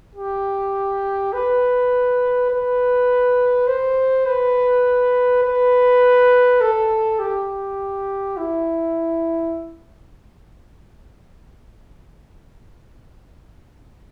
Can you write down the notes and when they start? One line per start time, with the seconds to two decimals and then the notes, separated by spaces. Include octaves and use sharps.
0.15 G4
1.33 B4
2.51 B4
3.67 C5
4.26 B4
5.43 B4
6.61 A4
7.19 G4
8.37 E4